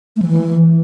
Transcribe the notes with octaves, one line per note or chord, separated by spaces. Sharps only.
A3
F3
E3